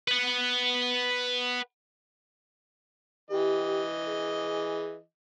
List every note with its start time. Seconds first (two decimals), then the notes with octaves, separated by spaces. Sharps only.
0.08 B4 F#5
3.30 E3 G4 D#5
4.08 G#4